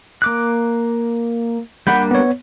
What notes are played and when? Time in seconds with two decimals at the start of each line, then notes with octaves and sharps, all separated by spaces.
0.22 A#3 D6 F#6
1.87 G3 A#3 D4 F#5 B5 G6
2.11 B3 C#5